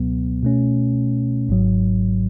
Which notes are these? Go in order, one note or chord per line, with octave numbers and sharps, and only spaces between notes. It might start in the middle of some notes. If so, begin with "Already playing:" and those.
Already playing: C#2 B2 F#3 B3
B2 A3 C#4
G#1 G#2 F#3